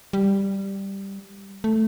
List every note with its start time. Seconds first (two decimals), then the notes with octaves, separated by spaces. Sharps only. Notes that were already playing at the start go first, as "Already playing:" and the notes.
0.13 G3
1.64 A3